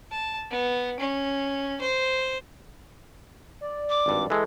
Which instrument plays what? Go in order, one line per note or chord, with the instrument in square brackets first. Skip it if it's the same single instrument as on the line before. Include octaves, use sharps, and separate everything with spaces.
[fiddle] A5
B3
C#4
C5
[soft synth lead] D5
[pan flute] D6
[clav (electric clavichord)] G#1 G2
[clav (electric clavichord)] E3 G#3 [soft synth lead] A4